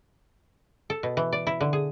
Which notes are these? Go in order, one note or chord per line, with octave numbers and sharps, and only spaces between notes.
A4
B2
E3
D5
E4
D3
G#4